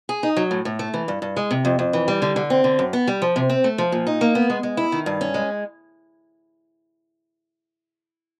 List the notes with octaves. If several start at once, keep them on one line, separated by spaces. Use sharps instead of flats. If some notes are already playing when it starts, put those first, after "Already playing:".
G#4
D#4
F#3
A2
A2
A3
E3
G2
G2
G#3
C3
F2
F2
E3
G3
D3
D3
C4
D3
F#2
B3
G3
F3
C3
C4
A3
F3
A#2
D#4
A#3
B3
G#3
G#3
E4
D#3
G2
C#4
G#3